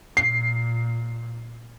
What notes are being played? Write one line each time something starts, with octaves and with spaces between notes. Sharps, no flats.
A#2 C7